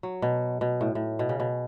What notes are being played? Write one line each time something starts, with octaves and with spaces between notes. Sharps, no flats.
F#3
B2
B2
A2
A2
B2
C#3
B2